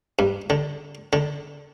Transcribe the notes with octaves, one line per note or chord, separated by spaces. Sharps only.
G2
D3
D3